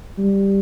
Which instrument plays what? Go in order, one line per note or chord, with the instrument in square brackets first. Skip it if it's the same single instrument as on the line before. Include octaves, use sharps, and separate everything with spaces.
[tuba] G3